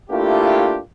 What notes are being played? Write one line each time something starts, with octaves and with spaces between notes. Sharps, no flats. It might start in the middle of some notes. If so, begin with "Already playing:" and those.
A3 A#3 D4 E4 F4 G4